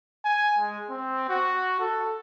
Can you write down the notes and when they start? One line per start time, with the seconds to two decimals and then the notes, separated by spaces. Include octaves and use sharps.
0.24 G#5
0.59 G#3
0.90 C4
1.29 F#4
1.80 A4